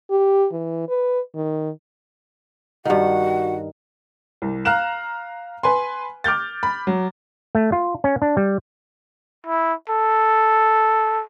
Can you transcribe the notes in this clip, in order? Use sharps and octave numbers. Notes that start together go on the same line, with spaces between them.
G4
E3
B4
D#3
G2 D#3 F#4 F#5
C2
F5 A#5 F6 F#6 E7
B4 G#5 C6
D6 F6 G6 A6
B5
F#3
A3
F4
C#4
D4
G3
E4
A4